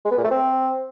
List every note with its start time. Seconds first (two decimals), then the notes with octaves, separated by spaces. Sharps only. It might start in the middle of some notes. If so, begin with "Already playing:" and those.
0.05 G#3
0.11 B3
0.18 A#2
0.24 A3
0.31 C4